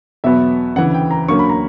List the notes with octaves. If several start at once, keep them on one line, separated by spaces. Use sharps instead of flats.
E2 B2 F#3 B3 E5
D2 C#3 E3 F#5
G5
A#5
D2 D3 F#3 A#3 C#4 C#6
B5
A#5